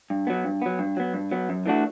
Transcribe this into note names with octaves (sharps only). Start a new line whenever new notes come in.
G2
F#3 B3
G2
F#3 B3
G2
F#3 B3
G2
F#3 B3
F#2
E3 A3 D4 F#4